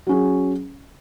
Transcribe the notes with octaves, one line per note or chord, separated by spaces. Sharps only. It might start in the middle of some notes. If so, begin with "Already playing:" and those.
F#3 C#4 G#4